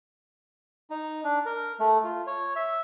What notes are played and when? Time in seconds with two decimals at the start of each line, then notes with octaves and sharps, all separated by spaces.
0.90 D#4
1.24 D4
1.46 A#4
1.80 A3
2.04 F4
2.27 C#5
2.56 E5